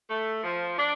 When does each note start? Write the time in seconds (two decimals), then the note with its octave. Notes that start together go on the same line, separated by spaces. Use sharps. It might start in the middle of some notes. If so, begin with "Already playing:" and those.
0.10 A3
0.44 F3
0.77 D4